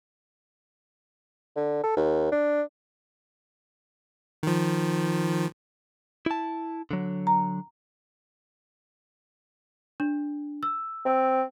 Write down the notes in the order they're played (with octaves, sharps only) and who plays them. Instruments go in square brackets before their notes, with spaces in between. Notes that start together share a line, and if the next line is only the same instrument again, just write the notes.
[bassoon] D3
A4
D#2
D4
[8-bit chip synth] D#3 F3
[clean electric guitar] E4 A5
D3 F#3
[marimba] A#5
[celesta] D4
E6
[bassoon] C4